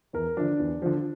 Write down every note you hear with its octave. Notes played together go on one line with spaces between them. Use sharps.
E2 A#4
D3 F3 D4 D5
E2
D3 F3